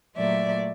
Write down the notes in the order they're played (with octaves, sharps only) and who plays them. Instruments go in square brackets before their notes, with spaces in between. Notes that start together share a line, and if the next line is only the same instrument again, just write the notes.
[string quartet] A#2 F#3 A3 D5 E5